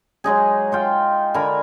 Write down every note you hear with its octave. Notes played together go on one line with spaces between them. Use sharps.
F#3 G#3 D#4 G#4
D#4 F4 G5
D3 A#4 G#5 B5